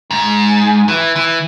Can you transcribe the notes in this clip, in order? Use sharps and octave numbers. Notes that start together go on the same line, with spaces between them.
G#2
E3
E3